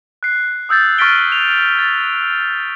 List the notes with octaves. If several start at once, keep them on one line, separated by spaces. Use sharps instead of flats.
F#6 C7
D#6 E6 G6 A6
C#6 F6 A6 B6 D7 G7
F7
A6